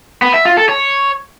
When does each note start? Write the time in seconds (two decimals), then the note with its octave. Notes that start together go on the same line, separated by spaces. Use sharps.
0.22 B3
0.34 E5
0.45 F4
0.57 A4
0.69 C#5